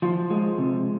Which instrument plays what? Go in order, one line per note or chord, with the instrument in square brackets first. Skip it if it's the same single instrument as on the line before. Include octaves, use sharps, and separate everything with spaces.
[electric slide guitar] F3 F4
G#3
C3